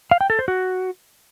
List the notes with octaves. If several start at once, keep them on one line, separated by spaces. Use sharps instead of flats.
F5
G5
A4
C5
F#4